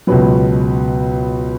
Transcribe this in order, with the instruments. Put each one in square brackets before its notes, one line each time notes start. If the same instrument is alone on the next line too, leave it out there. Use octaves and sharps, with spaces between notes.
[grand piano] C#2 B2 F#3 B4